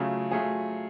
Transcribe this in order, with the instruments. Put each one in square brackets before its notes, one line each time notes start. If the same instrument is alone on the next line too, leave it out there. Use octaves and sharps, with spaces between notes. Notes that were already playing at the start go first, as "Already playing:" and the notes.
Already playing: [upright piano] C#3 F#3 A3 F4 G#4
F#3 A3 F4 G#4